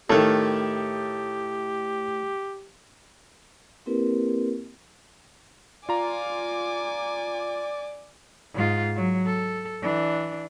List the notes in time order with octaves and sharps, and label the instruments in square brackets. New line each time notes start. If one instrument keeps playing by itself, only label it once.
[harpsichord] A2 F5 [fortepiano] D#3 A3 [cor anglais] G4
[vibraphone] A#3 C4 E4 G4 A#4 B4
[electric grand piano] F4 A#5 [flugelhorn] D5 [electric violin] G#5 D6
[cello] G#2 F4
F#3
A4
E3 D4